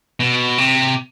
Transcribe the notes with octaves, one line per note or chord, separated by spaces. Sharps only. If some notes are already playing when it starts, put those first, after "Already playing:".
B2
C3